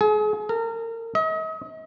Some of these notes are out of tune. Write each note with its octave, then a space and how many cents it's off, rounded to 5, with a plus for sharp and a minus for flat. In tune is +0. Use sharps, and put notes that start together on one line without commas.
G#4 +35
A#4 -30
D#5 +40